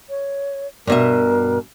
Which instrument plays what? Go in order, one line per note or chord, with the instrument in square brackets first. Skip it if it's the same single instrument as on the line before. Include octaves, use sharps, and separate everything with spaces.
[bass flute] C#5
[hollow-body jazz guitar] G2 B2 E5 [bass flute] A#4